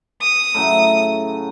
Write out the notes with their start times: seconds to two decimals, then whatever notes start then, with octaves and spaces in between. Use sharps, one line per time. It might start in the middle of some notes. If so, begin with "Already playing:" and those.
0.21 D#6
0.54 A2 C#3 F#3